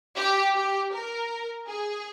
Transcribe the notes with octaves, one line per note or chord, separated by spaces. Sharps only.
G4
G4
A#4
G#4